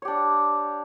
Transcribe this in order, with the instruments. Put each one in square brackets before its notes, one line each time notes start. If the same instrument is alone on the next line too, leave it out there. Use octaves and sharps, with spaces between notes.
[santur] C#5
G4
D4